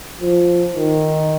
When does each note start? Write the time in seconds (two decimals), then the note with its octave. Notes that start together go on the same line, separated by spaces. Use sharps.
0.21 F3
0.73 D#3